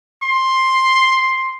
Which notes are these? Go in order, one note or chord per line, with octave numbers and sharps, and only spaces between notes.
C6